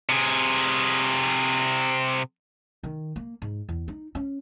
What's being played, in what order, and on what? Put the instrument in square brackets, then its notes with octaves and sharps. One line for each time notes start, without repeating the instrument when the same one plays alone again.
[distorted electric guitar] C3 G#4
[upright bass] D#3
A#3
G#2
E2
D#4
C#4